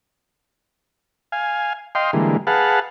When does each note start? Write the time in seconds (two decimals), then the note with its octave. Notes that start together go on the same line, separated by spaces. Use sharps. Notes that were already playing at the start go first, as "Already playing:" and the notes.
1.32 F5 G#5
1.95 D#5 F5 G5 C6
2.13 D3 E3 G3 G#3 A#3
2.47 G#4 B4 F5 F#5 A5